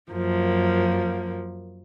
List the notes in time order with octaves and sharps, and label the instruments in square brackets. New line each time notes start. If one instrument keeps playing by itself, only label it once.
[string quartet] F#2 F3 A#3